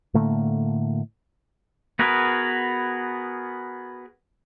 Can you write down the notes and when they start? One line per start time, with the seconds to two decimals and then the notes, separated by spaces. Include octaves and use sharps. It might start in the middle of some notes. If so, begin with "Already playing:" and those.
0.14 A2 D3 A3 A#3
1.99 B3 F#4 G#4 A#4 B4